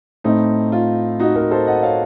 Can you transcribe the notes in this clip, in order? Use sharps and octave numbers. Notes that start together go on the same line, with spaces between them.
A2 A3 C4 D#4
F4
D#4 F#4
F#4 A#4
A4 C5
D#5 F#5
C#5 F5